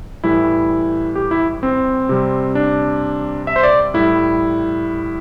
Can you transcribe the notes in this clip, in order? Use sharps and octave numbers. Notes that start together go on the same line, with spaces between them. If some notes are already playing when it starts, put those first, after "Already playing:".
A2 E3 G3 E4
G4
E4
C4
C3 G3
D4
E5
C5
D5
A2 G3 E4